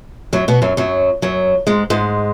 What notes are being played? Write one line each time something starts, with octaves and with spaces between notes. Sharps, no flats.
F#2 F#3
B2 B3
F#2 F#3
F#2 F#3
F#2 F#3
G#2 G#3
G#2 G#3